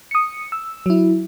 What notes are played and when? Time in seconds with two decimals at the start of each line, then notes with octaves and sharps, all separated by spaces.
0.11 D#6 C#7
0.52 E6
0.86 F#3 E4